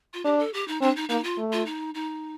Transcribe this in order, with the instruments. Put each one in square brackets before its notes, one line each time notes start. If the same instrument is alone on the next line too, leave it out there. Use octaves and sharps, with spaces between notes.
[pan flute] F4
[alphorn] D4 [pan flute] G4
[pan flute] A4
G4
D#4
[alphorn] C4 [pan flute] D4
[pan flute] D#4
[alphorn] A#3 [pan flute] D#4
[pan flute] F4
[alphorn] A3
[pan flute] F4
D#4
D#4